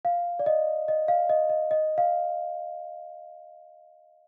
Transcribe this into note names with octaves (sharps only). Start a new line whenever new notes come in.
F5
D5
D#5
D#5
F5
D#5
D#5
D#5
F5